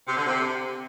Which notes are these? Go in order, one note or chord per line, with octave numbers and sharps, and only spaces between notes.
C3
D3
C3